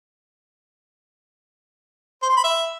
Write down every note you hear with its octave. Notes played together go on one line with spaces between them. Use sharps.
C5
C6
B5
E5